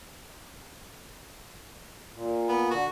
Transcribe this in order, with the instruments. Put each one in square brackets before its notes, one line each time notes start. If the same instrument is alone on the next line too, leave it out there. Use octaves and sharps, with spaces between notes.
[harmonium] A#2
[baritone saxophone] B3
[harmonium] D3 [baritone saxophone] F#4